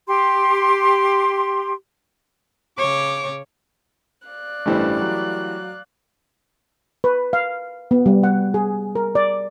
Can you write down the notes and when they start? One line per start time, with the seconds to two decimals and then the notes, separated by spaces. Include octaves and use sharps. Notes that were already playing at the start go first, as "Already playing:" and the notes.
0.07 G4 C6
2.78 C#3 C#5 D6
4.27 D5 F5 F#6
4.66 A1 G2 E3 G3 A3 C5
5.01 F#3
7.04 B4
7.33 F5
7.91 B3
8.06 G3
8.23 F#5
8.54 G#4
8.95 A#4
9.15 D5